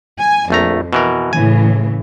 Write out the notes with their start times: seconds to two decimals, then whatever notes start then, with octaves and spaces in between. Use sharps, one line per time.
0.18 G#5
0.50 A#1 F2 A3 A#5
0.93 B2 E3 A#4
1.33 A2 C#3 E3 G#5